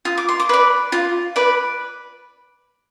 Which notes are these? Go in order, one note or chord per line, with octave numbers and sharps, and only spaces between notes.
F4 D#6
D6
C6
D6
B4 D5
F4
B4 D5